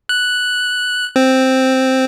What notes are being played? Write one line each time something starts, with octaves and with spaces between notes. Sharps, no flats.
F#6
C4